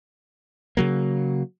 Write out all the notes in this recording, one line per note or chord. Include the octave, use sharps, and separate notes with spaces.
C#3 F#3 A#3